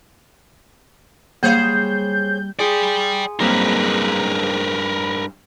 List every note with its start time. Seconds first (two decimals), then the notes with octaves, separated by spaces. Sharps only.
1.43 G3 A#3 G#4 C5 C#5 F5 G6
2.59 F4 G#4 D5 G5 G#5
3.40 G2 F#3 A#3 C4 D#4 A#4 B4